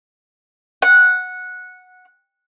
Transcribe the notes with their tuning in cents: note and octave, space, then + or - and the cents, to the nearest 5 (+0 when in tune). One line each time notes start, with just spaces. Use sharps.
F#5 -10